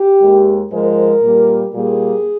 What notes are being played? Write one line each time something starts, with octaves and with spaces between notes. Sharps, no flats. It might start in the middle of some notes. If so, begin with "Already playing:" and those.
Already playing: G4
D#2 D#3 G#3
G#2 F3 G#3 A#4
A#2 G3 A#3
A#2 G3 A#3 G#4